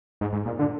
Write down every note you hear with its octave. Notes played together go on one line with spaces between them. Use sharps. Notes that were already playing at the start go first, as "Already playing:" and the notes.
G#2
G#2
A#2
D3